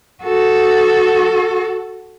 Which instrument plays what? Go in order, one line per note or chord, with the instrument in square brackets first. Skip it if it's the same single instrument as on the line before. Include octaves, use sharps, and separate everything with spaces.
[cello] F#4 A4